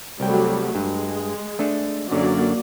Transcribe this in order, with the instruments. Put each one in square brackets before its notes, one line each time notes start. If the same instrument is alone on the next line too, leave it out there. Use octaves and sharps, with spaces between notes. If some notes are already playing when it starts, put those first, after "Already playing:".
[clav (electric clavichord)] C2 G5 [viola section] F#3 G3 A3
[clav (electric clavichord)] G2 [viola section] G#3
[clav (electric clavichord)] A3 D4 A4
[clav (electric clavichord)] F#2 D3 [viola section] F#3 A#3 D5